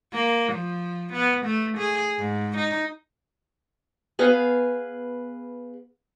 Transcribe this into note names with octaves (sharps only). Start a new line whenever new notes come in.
A#3
F3
B3
A3
G#4
G#2
D#4
B3 G#4 B4 F5